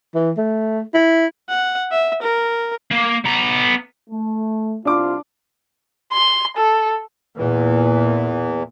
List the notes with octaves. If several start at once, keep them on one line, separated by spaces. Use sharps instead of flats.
E3
A3
E4
F#5
E5
A#4
A#3
B3 A#5
A3
C2 D4 F4 D6
C6
A4
E2 A#2 E3